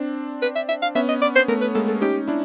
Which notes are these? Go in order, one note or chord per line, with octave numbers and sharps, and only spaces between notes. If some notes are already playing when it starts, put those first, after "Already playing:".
Already playing: C4 D4
B4
E5
E5
F5
B3 C#4 E5
D#5
D5
C5
A3 B3 A#4
B4
G#3 A#3 A4
A4
C#4 D#4 G4
D4 E4